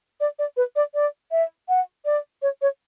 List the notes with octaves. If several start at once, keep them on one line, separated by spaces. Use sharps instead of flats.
D5
D5
B4
D5
D5
E5
F#5
D5
C#5
C#5